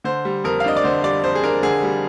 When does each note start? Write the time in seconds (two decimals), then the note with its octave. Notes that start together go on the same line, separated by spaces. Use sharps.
0.04 D3 C5
0.25 G3
0.44 F2 A#4
0.60 F5
0.64 D4 D#5
0.76 D5
0.84 D3 C5
1.04 G3 D5
1.24 F2 C5
1.35 G#4
1.43 D4 A#4
1.63 D3 G#4
1.83 G3